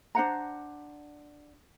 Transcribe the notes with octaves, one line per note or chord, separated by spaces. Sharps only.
D4 C5 F#5 A#5